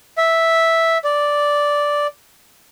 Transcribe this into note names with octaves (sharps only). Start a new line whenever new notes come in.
E5
D5